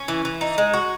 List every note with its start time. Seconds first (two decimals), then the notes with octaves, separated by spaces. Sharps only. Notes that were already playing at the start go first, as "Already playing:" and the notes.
Already playing: C#4
0.08 E3
0.25 E3
0.41 D#4
0.58 G#3
0.74 F#4